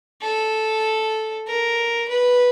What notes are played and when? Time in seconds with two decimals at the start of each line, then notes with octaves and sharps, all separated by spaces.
0.22 A4
1.47 A#4
2.09 B4